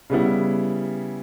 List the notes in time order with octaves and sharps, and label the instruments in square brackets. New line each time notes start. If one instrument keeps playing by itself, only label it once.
[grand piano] C#3 G3 B3 E4